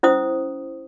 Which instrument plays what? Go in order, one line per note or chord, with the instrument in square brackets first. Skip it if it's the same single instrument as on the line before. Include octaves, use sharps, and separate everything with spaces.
[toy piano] C#4 E4 C5 D#6